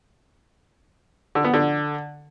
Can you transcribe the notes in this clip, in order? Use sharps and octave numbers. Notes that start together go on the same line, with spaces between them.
D3
B3
D3